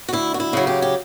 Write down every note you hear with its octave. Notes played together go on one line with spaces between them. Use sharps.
F#4
D2 E4
F#4
E4
C#3 F#3
G4
G4